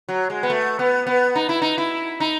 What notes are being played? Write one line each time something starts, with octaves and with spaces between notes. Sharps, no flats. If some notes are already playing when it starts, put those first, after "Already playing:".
F#3
G#3
B3
A3
B3
B3
D#4
E4
D#4
E4
D#4